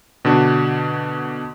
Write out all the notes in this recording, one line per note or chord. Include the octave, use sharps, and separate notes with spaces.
B2 D3 D4 F#4